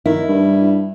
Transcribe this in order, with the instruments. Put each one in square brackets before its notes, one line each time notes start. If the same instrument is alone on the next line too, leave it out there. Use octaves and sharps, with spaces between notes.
[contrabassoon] D#3 [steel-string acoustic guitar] E4
[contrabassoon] G2